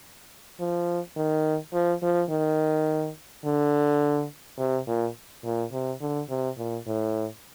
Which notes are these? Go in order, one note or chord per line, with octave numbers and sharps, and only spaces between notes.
F3
D#3
F3
F3
D#3
D3
C3
A#2
A#2
C3
D3
C3
A#2
A2